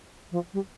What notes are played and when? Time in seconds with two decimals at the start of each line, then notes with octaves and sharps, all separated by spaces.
0.31 F3
0.53 G3